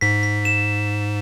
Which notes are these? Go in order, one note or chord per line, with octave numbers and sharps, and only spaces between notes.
G#2 B6
B6
E7